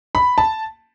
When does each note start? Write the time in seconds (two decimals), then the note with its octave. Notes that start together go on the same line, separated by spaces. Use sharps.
0.15 B5
0.38 A5